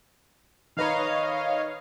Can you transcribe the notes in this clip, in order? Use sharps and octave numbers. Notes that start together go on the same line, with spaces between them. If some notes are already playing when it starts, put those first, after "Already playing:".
D#3 B4 C#5 D#5 F5 A#5